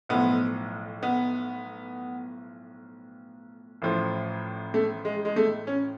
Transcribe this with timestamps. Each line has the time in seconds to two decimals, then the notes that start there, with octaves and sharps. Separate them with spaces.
0.09 B1 A2 F3 B3
1.03 B3
3.82 A1 A2 F3
4.74 A3
5.05 G#3
5.25 G#3
5.36 A3
5.67 C#4